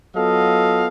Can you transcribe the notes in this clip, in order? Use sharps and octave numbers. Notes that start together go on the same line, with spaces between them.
F#3 B3 F4 A4 D#5 F5